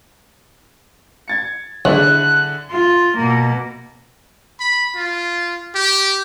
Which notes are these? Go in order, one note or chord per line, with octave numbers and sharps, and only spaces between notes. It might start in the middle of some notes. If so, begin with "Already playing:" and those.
G#6 A6 C#7
D#2 D3 E4 G#4 F#6
F4
B2 A#3
B5
F4
G4